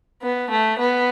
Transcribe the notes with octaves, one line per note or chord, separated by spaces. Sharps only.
B3
A3
B3